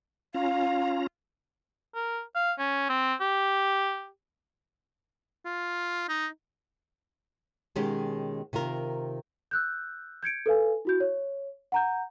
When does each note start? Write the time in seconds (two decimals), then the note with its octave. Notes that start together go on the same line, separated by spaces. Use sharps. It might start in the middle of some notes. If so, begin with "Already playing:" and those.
0.35 C#4 F4 F5 A#5
1.95 A#4
2.36 F5
2.59 C#4
2.89 C4
3.21 G4
5.45 F4
6.08 D#4
7.76 B2 D#3 G#3 C#4 G4
8.53 C3 D#3 F4 A#4
9.51 E6 F#6 G6
10.23 G6 G#6 C#7 D7
10.46 A4 B4 F5 G#5
10.85 E4 F#4 G6
11.00 C#5
11.72 F#5 A#5 G6